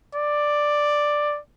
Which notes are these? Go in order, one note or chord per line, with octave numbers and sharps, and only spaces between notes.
D5